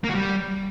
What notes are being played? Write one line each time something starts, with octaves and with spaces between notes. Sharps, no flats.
A#3
F#4
G3